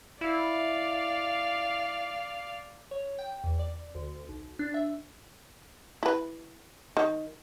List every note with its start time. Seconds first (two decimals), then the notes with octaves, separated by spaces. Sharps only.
0.21 E4 D5 F5
2.91 C#5
3.19 G5
3.44 E2
3.59 D5
3.95 D2
4.29 B1
4.59 D4
4.74 E5
6.03 E4 B4
6.97 D#3